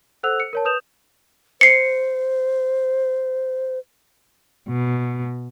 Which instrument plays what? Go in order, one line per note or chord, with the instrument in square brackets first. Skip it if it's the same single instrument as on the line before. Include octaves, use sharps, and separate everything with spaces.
[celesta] A4 C5 F#5 E6 F#6 F7
C#7
A#4 C#5 A5
B4 D#6 G6 E7 F7
[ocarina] C5 [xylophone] C7 C#7
[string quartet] B2